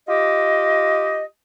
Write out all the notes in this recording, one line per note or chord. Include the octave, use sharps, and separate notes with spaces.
F4 G4 D#5